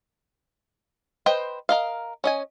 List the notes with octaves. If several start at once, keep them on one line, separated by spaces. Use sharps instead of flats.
B4 C5 D#5 G5
A#4 D#5 F5
C#4 D#5 G#5